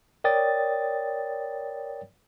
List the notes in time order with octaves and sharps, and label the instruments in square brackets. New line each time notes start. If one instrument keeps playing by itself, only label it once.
[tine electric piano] A#4 C#5 D5 G5 D#6 A6